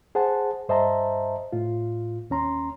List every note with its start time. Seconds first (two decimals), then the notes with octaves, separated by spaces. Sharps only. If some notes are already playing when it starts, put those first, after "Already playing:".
0.15 G#4 C5 F#5 A5
0.69 G2 C5 D#5 E5 A5 A#5
1.52 A2 F4
2.30 D#2 C#4 A#5 C6